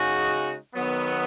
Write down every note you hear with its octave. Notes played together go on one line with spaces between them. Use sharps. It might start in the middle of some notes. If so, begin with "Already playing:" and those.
Already playing: C#3 G#3 D#4 F#4
D#3 F#3 B3